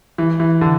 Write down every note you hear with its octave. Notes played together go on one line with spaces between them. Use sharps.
E3
E3
D3